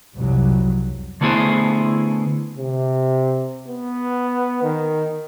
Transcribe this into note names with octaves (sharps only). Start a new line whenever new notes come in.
C2 F2 F#3
D3 A3 B3 E4 G#4 C5
C3
B3
D#3